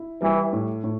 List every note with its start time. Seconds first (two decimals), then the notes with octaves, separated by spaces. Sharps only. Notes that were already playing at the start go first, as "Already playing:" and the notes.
Already playing: E4
0.22 E3 G3
0.53 A2
0.84 A2